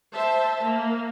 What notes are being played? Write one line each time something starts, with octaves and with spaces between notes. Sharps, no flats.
C5 E5 A5
A#3